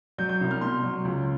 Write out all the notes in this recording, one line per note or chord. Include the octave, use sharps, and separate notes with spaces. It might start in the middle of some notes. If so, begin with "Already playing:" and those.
F#3 G6
G6
C2
F6
B2 C6
F#3
C#2